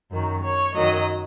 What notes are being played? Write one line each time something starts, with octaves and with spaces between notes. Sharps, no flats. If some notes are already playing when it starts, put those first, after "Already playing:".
F#2 D#3 F#3
C#5
F#2 D#3 F#3 D#5